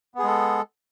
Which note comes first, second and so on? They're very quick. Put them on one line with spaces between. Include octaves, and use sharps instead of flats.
B3 G#4 G#3 A4